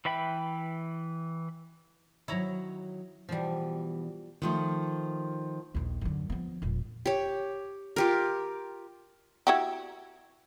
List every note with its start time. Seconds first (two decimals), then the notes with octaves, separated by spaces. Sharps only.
0.05 E3 B4 E5 G5 B5
2.28 D#3 F#3 E4 C#5 A#5
3.29 B2 E3 F3 G3
4.42 D#3 F3 A3
5.74 A#1 D#2
6.01 F#2 D3
6.30 F3 B3
6.62 E1 A#1
7.06 G4 C#5
7.96 F4 G4 A#4
9.47 E4 F#4 G4